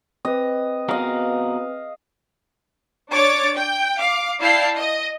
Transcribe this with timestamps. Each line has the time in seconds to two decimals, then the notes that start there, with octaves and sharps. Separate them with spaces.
0.25 C4 B4 D#5
0.89 B3 F#4 A#4 D#5 F5
3.12 D4 C#5 D6 A6
3.58 G5
4.00 F5 D6
4.40 E4 D5 F5 G5 A5 C7
4.78 D#5